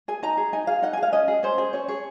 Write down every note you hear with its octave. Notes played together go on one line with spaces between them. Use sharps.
G#4 G#5
D#4 A#5
G#4
D#4 G#5
G#4 F5
D#4 F#5
G#5
G#4
F5
C#4 D#5
G#4
C#4 C5
G#4
C#4 C#5
G#4 C#5